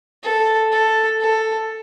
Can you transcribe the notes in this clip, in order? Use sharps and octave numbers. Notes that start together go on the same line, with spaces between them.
A4
A4
A4